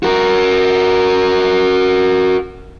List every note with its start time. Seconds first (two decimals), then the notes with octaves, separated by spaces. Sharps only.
0.03 F#4 A#4